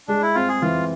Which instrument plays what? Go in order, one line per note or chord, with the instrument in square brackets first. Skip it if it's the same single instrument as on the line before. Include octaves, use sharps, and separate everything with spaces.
[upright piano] G#3 [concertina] D4
[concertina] E4
[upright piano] C4 [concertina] F4
[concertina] G#4
[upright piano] E3 [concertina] F4